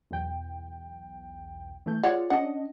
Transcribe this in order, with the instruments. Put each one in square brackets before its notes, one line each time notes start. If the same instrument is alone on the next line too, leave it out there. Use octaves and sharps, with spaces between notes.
[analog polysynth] B1 E2 G5
E3 A3 G6
[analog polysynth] F4 G#4 [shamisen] C#5 D5 F#5
[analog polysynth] C#4 D4 D#5 [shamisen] F#5